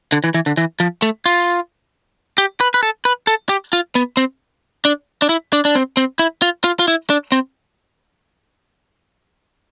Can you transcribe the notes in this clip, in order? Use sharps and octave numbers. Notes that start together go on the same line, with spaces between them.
D3
E3
E3
D3
E3
F3
A3
F4
G4
B4
B4
A4
B4
A4
G4
F4
B3
C4
D4
D4
E4
D4
D4
C4
C4
E4
F4
F4
F4
E4
D4
C4